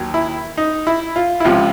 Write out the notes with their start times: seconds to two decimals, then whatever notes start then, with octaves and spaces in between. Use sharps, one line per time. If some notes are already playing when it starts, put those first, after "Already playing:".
Already playing: D#2 D#3 F#3
0.14 E4
0.57 D#4
0.87 E4
1.16 F4
1.40 E4
1.45 C#2 C3 F3 F4